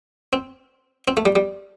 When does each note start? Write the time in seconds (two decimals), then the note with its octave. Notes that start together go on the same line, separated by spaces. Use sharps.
0.33 C4
1.08 C4
1.17 A3
1.26 G3
1.36 G3